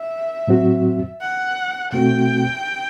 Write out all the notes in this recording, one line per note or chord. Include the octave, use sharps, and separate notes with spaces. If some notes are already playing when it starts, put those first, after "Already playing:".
Already playing: E5
A2 F#3 C4 F#4
F#5
B2 A3 C4 F#4 G5